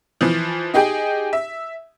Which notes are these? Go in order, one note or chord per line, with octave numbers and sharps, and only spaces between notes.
E3 F3
D#4 G4 G#4 G5
E5